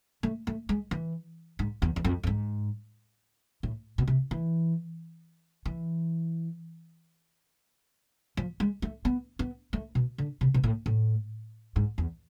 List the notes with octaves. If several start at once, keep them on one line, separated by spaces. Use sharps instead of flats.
A3
A3
G#3
E3
G#2
E2
E2
F2
F2
G#2
A2
B2
C3
E3
E3
F3
G#3
A3
B3
B3
A3
B2
D3
C3
B2
A2
A2
G#2
E2